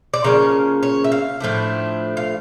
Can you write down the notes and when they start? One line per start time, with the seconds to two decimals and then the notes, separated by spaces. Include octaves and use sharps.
0.14 D5
0.24 C#3 F3 A#3 C#4 C#5
0.83 C#5
1.04 E5
1.12 F5
1.41 A2 F3 A3 D4
2.17 F5